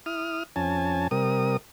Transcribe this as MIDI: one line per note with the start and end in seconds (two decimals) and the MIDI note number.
0.06 0.43 64
0.06 0.43 87
0.06 0.43 89
0.56 1.08 41
0.56 1.08 61
0.56 1.08 80
0.56 1.08 81
1.11 1.57 48
1.11 1.57 55
1.11 1.57 70
1.11 1.57 87